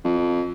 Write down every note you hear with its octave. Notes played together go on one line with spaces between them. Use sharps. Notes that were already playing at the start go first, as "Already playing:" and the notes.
F2